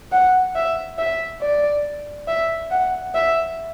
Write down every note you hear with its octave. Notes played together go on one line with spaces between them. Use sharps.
F#5
E5
E5
D5
E5
F#5
E5